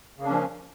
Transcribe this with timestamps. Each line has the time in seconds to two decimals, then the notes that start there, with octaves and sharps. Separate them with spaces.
0.18 C#3
0.21 A#3
0.24 D4
0.27 C#4
0.31 F3